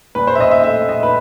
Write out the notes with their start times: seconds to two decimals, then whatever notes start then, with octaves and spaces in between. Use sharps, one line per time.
0.15 A#2 B4
0.27 C5
0.35 E5
0.39 A#2 D#5
0.51 E5
0.64 A3 E5
0.88 A#2 D#5
1.03 B4